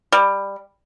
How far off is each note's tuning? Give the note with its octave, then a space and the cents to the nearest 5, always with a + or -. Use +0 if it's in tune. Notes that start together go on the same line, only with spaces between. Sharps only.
G3 +15